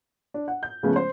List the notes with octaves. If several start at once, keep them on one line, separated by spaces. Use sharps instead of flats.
D4
F#5
G6
C#3 F3 G#3 A3 B3 C#4
C5